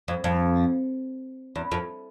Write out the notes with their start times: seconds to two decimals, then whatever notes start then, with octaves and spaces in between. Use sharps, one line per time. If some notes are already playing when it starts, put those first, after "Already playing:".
0.08 F2
0.24 F2
1.55 E2
1.72 F2